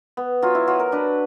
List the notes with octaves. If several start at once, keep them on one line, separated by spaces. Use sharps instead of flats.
B3
F#3 F4
E4
F#3 F4
A#4
D4 B4